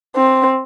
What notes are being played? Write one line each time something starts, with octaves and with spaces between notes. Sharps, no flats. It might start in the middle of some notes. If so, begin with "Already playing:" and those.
C4